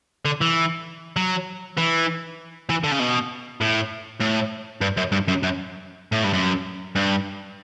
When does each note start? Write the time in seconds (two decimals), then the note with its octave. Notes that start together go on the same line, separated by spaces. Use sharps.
0.25 D3
0.41 E3
1.17 F#3
1.78 E3
2.69 E3
2.83 D3
2.91 C#3
2.99 B2
3.61 A2
4.21 A2
4.81 G2
4.97 F#2
5.12 G2
5.28 F#2
5.43 F#2
6.12 A2
6.24 G2
6.33 F#2
6.95 G2